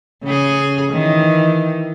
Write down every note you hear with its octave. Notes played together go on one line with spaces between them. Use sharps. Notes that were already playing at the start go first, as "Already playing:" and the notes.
C#3 G#4
D#3 E3